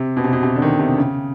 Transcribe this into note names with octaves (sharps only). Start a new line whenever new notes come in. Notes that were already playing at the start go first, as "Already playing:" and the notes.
Already playing: C3
B2
C3
B2
C3
D3
D#3
C3
C#3